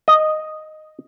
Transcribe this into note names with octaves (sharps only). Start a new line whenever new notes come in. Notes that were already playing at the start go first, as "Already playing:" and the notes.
D#5